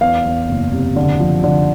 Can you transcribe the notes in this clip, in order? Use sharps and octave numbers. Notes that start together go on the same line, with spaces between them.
E2 F5
E2
F#1
C3
D3
F3
D3